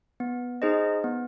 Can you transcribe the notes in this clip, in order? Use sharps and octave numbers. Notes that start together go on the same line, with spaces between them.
B3
D#4 G#4 C5 D#5
B3